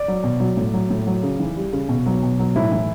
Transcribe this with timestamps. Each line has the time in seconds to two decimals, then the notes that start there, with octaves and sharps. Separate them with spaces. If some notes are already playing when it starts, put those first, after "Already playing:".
Already playing: D5
0.08 F#3
0.24 B2
0.40 F#3
0.57 A2
0.73 F#3
0.90 A2
1.07 F#3
1.23 C#3
1.40 E3
1.56 G3
1.73 C#3
1.89 B2
2.06 F#3
2.23 B2
2.39 F#3
2.55 A2 E4
2.72 E3